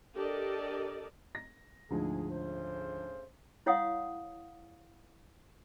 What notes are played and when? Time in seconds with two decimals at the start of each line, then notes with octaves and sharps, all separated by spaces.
0.14 D4 G4 A4 A#4 D5 D#5
1.35 A#6
1.91 D2 G#2 F3 G#4
2.29 C#3 A3 C5
3.66 E4 C#5 F5 F#5 D#6